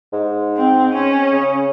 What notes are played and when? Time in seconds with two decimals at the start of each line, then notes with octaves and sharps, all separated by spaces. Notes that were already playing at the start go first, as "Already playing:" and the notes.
0.13 G#2
0.57 C4
0.93 C#4
1.32 C#3